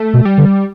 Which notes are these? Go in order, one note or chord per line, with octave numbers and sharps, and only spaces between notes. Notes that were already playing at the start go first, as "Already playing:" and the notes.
Already playing: A3
B2
G3
D3